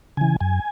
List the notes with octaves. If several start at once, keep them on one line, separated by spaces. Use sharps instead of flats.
C#3 E3 G#5
F#2 G#5